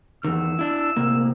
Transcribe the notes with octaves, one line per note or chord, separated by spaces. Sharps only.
E2 D#3 E6
D4 E4
A2 C3 A#3